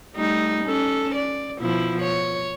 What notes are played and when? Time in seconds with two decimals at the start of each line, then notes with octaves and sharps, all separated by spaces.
0.16 G3 A3 D#4
0.65 C#4 A4
1.15 D5
1.60 B2 F3 E4
2.02 C#5